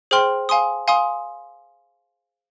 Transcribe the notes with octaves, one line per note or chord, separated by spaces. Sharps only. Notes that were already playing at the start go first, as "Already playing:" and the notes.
G#4 C5 G5 C6 F6
F5 G#5 C6 D#6
F5 G#5 C6 D#6